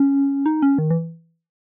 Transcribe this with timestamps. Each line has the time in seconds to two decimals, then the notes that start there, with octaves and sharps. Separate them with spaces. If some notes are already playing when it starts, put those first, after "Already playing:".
Already playing: C#4
0.46 D#4
0.62 C#4
0.78 D#3
0.90 E3